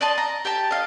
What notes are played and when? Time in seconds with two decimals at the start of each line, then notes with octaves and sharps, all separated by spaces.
0.01 D5 D#5 A5 C6
0.18 A#5
0.45 G4 G5 A5
0.71 D#5 F5